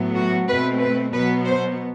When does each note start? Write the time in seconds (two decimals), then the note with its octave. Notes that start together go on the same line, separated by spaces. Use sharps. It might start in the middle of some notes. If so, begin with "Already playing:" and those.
Already playing: A2 F#3 B3
0.15 F#4
0.48 B2 A3 C4 B4
0.80 B4
1.13 B2 F#3 B3 B4
1.45 C5